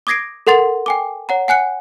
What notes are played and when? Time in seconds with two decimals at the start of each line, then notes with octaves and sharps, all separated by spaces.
0.07 D6 D#6 G#6 A#6 C7 D7
0.47 A4 A#4 F#5 C6 A6 F7
0.86 G5 G#5 D6
1.29 C#5 F#5 A#5
1.48 F#5 G#5 F#6 C#7